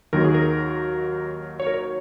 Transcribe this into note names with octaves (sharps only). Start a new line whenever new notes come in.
D#2 D#3 F#3 A#4
G#4
A#4
C#5
A#4
C#5